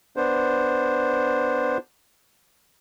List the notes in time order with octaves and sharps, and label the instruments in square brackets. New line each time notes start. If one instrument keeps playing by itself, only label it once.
[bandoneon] B3 D4 C5